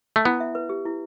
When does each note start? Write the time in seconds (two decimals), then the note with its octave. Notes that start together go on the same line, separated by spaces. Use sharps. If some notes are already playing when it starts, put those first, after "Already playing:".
0.16 A3
0.25 B3 E4
0.40 E5
0.55 B4
0.69 G4
0.86 E4